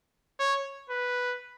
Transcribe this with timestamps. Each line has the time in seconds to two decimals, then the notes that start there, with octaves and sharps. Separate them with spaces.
0.40 C#5
0.90 B4